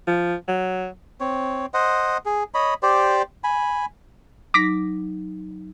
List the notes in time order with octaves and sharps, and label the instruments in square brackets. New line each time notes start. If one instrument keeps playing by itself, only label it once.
[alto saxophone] F3
F#3
[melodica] C4 C#5
C5 D#5 F#5
G#4
C#5 D#5 B5
G4 C5 D5
G#5 B5
[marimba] F#3 D#4 [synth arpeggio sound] D6 A#6 B6